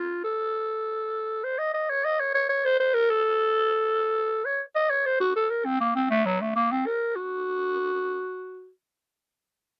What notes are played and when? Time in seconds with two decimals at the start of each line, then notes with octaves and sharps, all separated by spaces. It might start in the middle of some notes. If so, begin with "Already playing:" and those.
Already playing: F4
0.24 A4
1.44 C5
1.59 D#5
1.74 D#5
1.90 C#5
2.05 D#5
2.20 C#5
2.34 C#5
2.49 C#5
2.65 C5
2.80 C5
2.94 A#4
3.10 A4
4.45 C#5
4.75 D#5
4.90 C#5
5.06 C5
5.20 F#4
5.36 A4
5.50 A#4
5.65 C4
5.81 A#3
5.95 C4
6.10 A3
6.26 F#3
6.41 A3
6.56 A#3
6.72 C4
6.86 A#4
7.16 F#4